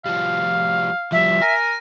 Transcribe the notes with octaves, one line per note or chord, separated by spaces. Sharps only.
F3 G3 F5
F3 G3 E5
A#4 G#5